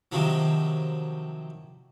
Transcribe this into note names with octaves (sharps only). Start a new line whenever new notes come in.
C3 D#3 F3 F#3